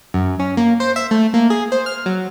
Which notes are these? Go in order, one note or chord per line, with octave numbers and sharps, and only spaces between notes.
F#2
C#4
A#3
C5
E5
A3
A#3
G#4
C5
F6
F#3